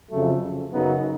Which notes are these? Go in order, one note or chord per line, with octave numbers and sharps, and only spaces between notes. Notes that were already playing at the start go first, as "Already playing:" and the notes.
F2 C#3 F#3 A3
F#2 C#3 F#3 B3 D#4